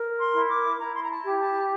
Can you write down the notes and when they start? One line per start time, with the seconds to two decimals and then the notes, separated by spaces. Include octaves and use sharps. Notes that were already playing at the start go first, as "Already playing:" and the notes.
Already playing: A#4
0.19 C6
0.34 E4
0.50 D6
0.79 E4 A#5
0.95 C6
1.03 A#5
1.10 A5
1.25 G4
1.39 A5